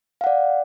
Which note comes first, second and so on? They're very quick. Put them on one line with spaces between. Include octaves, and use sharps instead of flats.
F5 F#5 D5